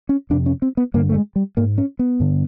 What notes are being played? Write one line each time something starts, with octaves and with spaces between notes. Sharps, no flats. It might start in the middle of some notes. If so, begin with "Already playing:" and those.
C#4
F2 C3 D4
C#4
C4
B3
G2 D3 A#3
A3
G#3
G3
G#2 A#3
C#4
B3
G2 D3